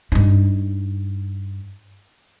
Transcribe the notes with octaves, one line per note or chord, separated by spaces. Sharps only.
G2 D#4